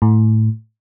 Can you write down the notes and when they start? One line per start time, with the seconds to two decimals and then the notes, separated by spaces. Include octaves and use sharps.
0.02 A2